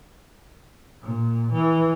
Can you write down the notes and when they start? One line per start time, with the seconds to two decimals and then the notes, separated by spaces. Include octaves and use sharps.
1.02 A#2
1.52 E3